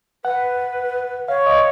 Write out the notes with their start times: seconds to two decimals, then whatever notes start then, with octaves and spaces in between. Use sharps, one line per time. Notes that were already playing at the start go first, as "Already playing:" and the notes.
0.25 B4 F#5
1.28 C#5 F5
1.46 D#5